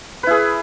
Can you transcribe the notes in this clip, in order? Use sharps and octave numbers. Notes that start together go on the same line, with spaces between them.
E4 G#4 B4